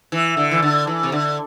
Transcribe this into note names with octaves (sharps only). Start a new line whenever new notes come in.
E3
D3
E3
D3
E3
C3
D3